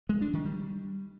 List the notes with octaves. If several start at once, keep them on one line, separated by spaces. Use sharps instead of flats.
G#3
D4
D#3
G3